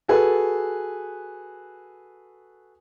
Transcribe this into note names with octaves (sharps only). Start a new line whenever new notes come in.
F#4 G#4 A4 B4